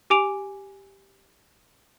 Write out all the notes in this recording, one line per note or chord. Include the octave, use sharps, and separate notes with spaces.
G4 G#5 D6 D7 F7